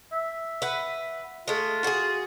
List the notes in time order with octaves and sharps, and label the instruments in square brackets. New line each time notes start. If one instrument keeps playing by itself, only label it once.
[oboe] E5
[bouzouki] B4 F#5
[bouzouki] G#3 A3 [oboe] F4
[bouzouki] F#4 G#4